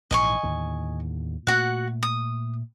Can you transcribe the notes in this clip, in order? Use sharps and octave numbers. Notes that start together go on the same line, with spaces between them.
A#1 G#2 E3 D#5 G#5 C#6
D#2 A2 D3
A#2 A3 F#4 F#5
D#6